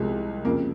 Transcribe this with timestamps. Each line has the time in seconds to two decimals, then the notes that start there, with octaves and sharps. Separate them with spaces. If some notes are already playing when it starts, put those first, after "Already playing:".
Already playing: C2 C3 F3 G#3
0.45 F2 C#3 F3 A#3